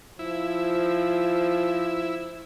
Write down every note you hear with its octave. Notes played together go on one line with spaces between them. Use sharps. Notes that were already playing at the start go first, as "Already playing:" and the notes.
F3 E4